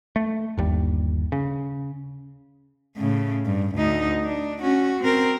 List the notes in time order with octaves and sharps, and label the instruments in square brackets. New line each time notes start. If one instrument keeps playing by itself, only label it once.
[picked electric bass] A3
G1 D#2 G3
C#3
[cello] A2 C#3
G2
D2 D#4
D4
C#4 F#4
C4 A#4